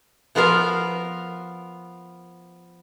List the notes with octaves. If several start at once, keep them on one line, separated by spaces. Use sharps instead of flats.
F3 B3 F4 A#4 F5